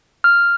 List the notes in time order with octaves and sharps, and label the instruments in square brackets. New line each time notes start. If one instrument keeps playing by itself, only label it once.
[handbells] F6